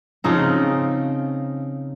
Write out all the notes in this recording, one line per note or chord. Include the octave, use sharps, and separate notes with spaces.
C#3 F3 C4 D#4